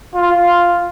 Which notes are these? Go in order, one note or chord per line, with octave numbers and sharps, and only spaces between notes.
F4